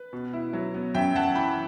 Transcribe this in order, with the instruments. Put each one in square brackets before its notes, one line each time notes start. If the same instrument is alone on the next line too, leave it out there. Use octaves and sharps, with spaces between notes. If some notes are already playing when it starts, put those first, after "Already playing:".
Already playing: [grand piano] B4
B2
E4
F#3
B3
F#2 E5 G5
F#2 F#5 A5
E3 G5 B5